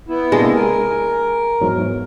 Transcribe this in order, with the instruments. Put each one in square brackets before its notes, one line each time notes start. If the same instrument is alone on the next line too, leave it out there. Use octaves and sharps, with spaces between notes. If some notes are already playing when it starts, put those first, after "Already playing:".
[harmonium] B3 E4
[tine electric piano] C3 A#3 D4 [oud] G#3
[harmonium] A#4 [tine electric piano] G#5
[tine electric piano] E2 G#2 F#3